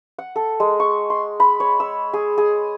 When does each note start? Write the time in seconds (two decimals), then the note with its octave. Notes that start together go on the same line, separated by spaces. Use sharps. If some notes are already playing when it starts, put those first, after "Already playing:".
0.18 F#5
0.36 A4
0.60 G#3
0.80 C#6
1.10 C6
1.40 B5
1.60 C#5
1.80 E6
2.13 G#4
2.38 G#4